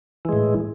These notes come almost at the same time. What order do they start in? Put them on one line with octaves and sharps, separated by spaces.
E3 G#3 A2